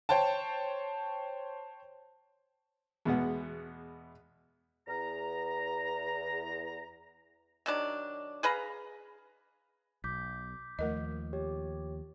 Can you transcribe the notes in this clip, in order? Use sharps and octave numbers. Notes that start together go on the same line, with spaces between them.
C5 C#5 G5 A5
E2 B2 G#3 B3 F#5
E2 A#5
D#3 F#3 D4
G#4 B4 F5 A#5
B1 D6 G6 B6
D#2 F3 A3 A#4 D#5
G4 C#5